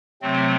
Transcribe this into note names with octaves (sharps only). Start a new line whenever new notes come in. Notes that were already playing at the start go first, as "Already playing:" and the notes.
C3 F#3 A3 C4